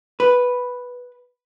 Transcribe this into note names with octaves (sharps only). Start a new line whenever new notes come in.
B4